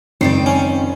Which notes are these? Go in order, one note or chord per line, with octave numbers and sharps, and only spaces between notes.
F#1 C#2 D#3 C4 D5 C7
C#4